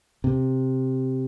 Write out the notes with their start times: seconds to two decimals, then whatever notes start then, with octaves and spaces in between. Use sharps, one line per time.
0.24 C3